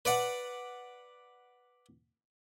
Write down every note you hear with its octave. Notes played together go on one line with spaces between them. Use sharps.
B4 D5 F#5